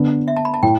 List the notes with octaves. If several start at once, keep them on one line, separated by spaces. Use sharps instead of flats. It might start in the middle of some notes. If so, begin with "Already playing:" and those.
Already playing: D3 B3 D4
E5
A5
B5
A5
A2 G5